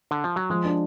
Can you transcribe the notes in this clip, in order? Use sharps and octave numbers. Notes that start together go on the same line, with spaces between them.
D3
F3
F#3
F3 G#3
D4